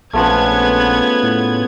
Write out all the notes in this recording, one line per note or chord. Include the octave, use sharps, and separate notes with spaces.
A#1 C#3 F3 A3 B3 G#6
A2